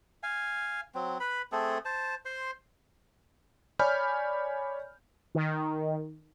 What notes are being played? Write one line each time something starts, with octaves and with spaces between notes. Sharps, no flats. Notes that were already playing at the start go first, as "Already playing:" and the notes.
F5 G#5
F#3 C4
B4 B5
A3 C4 G#4 A4
C5 A5
C5 C6
C#5 D5 G#5 B5 F6 G6
D#3